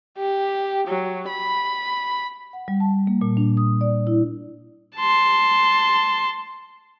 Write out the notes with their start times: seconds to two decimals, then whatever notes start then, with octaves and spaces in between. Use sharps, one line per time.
0.18 G4
0.87 F#3
1.28 B5
2.53 F#5
2.68 G3
2.80 A5
3.07 A#3
3.21 A#2
3.37 D4
3.57 D#6
3.81 D5
4.07 E4
4.97 A5 C6